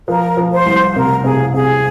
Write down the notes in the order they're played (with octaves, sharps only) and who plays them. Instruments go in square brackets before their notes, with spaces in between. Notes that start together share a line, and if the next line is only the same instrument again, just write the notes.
[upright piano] F3 [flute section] A#4
[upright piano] F3
[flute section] C5
[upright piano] C2
[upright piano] C3 [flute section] A#4
[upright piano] C3 [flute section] G#4
[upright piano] C3 [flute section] G#4